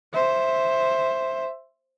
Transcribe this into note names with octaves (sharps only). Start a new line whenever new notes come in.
C5 E5